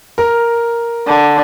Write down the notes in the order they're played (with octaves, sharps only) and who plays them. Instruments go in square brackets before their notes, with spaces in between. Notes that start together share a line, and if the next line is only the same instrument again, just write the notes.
[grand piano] A#4
[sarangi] D3